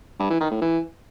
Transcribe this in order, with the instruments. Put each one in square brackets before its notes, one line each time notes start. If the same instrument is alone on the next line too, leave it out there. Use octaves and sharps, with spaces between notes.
[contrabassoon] G2
E3
D#3
A2
E3